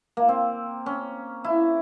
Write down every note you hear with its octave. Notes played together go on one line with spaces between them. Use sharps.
A#3
C4
C#4
E4